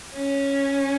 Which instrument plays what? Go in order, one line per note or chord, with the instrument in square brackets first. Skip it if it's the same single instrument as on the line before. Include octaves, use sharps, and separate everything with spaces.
[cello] C#4